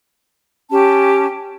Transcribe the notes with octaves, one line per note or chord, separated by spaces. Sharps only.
C#4 G4 A5